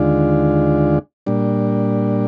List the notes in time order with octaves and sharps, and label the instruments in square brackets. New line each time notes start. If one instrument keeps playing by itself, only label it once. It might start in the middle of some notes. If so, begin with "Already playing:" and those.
Already playing: [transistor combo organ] D#2 D3 G#3 D4 F4
A#2 G3 D4